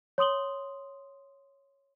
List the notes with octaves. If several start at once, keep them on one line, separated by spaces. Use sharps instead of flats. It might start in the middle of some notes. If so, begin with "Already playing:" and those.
C#5 C6 D#6 F#7 G7